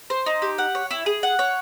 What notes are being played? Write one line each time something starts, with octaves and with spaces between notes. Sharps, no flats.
C5
D#4
G4
F#5
C#5
E4
G#4
F#5
C#5